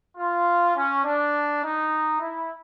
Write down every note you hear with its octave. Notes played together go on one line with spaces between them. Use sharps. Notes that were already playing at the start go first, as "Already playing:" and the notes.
F4
C#4
D4
D#4
E4